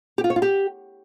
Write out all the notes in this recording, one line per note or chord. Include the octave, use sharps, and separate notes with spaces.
G4
F4
C#5
F4
G4